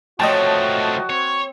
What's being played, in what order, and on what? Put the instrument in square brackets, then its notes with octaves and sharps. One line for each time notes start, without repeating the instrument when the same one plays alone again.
[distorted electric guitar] F3 A3 [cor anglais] F#4 [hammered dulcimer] C#5 [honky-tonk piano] D#5 G5 A5
[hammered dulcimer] C4 [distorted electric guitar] C#5